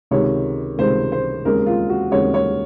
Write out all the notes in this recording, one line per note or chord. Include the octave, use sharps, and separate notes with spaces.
C#2 C3 D#3 C#5
C#2 C3 D#3 C5
C5
D#2 C#3 G#3 C4 A#4
F4
F#4
D#2 C#3 G#3 C4 C#5
C#5